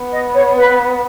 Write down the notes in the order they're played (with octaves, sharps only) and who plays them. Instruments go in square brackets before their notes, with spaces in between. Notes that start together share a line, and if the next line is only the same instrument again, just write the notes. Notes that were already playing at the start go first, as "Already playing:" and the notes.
Already playing: [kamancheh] B3
[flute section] D#5
C#5
B4